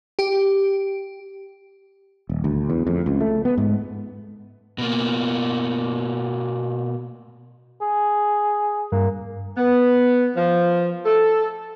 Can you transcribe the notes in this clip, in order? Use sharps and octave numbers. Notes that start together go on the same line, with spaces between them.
G4
D#1
D2
E2
F2
C#2
A3
B3
G#2
B2 A#3
G#4
G2 A#3
B3
F3
A4